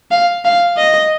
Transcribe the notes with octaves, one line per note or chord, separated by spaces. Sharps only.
F5
F5
D#5